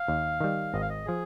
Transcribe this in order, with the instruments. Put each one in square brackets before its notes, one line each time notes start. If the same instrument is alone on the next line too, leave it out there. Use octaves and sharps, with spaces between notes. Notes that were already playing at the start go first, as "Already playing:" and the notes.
Already playing: [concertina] F5
[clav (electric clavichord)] D#2
D#3 G3
[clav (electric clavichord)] G#1 [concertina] D#5
[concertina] F5
D#5
[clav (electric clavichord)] F3 [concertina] G#4